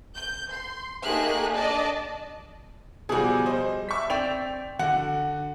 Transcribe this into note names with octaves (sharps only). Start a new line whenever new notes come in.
G6
C6
A3 A#3 D#4 G4 G#4 F#6
D4 D5 D#5 A5
B2 F3 G3 F#4 G#4
C5 D#5
E5 C#6 B6
C4 D5 G5 F7
D3 F#4 F#5